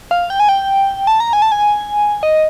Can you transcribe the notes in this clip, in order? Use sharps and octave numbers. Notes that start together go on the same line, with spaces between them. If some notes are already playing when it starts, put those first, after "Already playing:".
F5
G5
G#5
G5
A5
A#5
G#5
A5
G#5
D#5